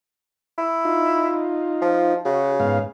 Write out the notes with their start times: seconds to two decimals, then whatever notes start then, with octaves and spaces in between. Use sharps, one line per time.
0.58 E4
0.85 D#4 F4
1.82 F3
2.25 C#3 F#4
2.60 G#2 B3 F5